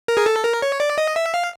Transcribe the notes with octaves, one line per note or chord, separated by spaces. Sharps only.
A#4
G#4
A4
A#4
C#5
D5
D#5
E5
F5